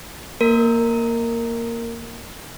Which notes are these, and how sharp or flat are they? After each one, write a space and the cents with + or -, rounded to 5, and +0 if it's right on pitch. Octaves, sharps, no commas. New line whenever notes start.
A#3 +0 A#4 -15